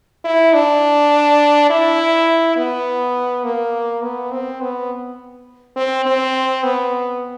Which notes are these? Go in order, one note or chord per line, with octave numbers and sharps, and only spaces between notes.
E4
D4
E4
B3
A#3
B3
C4
B3
C4
C4
B3